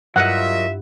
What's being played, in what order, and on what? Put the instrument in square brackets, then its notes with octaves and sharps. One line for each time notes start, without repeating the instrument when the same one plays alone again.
[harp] G2 E4 [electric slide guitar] F#3 A#4 D#5 [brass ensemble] F4 E5 [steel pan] F#5